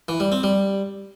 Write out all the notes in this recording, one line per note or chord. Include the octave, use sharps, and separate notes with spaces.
E3
G3
C4
G3